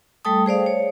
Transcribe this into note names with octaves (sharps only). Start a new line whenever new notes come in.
G3 A3 A4 G5 A5 D#6
G#4 C5 D5 F5
C#5